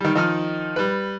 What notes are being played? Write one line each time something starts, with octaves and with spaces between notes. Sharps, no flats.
D#3 G3
D#3 F3 D#4 D#6 F6
G3 B4